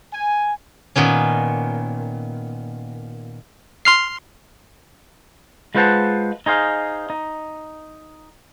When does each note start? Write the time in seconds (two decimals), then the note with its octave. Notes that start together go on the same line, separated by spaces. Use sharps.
0.13 G#5
0.96 A#2 D#3 B3 C#4
3.85 C6 F6 C7
5.75 G#3 F4 B4 C5 F#5 A5
6.46 D#4 G#4 C5 F5
7.10 D#4